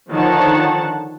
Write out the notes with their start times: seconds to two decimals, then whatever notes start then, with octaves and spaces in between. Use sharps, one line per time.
0.11 D3 D#3 F3 C#5 F#5 A5